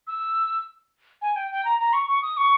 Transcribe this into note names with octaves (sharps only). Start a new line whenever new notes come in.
E6
G#5
G5
G5
A#5
A#5
C#6
C#6
D#6
C#6